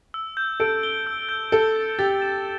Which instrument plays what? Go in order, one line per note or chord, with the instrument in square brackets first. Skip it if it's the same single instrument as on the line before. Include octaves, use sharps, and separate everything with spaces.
[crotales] E6
G6
[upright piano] A4 [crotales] D7
[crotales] G7
E6
G6
[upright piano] A4 [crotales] G7
[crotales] A6
[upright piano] G4 [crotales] A6
[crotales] E7